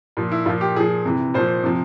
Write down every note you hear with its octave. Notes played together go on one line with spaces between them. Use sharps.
A#2 F3
E4
A#2 F3 F4
G4
A#2 F3 G#4
C3 E3
A#2 F3 C5
C3 F3